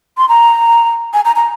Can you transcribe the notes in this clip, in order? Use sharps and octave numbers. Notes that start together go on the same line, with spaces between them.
C6
A#5
G#5
A#5
A#5